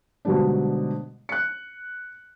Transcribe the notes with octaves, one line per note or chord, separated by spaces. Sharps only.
G#2 B2 D3 F#3 G3 D4
F#6 C#7